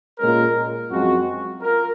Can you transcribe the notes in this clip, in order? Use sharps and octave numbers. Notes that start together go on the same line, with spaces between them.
A#2 G#3 C#4 F4 A#4
F#2 F3 G#3 C4 F#4
F4 A#4